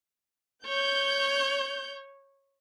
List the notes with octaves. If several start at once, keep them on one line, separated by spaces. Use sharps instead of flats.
C#5 G6